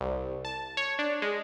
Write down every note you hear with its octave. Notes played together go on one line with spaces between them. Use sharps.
C2
A5
C#5
D4
G#3